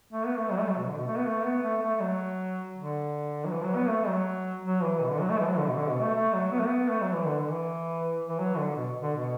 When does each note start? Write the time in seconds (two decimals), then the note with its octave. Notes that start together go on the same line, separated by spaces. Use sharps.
0.13 A3
0.26 B3
0.38 A3
0.51 F#3
0.59 A3
0.69 F#3
0.79 B2
0.88 D3
0.97 B2
1.07 A3
1.17 B3
1.26 A3
1.45 B3
1.63 A3
1.82 A3
2.00 F#3
2.75 D3
3.46 F#3
3.51 E3
3.64 F#3
3.76 B3
3.89 A3
4.07 F#3
4.64 F#3
4.83 E3
5.01 B2
5.11 D3
5.20 F#3
5.29 A3
5.39 E3
5.48 F#3
5.58 D3
5.67 B2
5.76 D3
5.89 B2
6.01 A3
6.14 A3
6.33 F#3
6.52 B3
6.60 A3
6.67 B3
6.89 A3
7.01 F#3
7.14 E3
7.27 D3
7.39 D3
7.51 E3
8.29 E3
8.39 F#3
8.58 D3
8.76 B2
9.02 D3
9.15 B2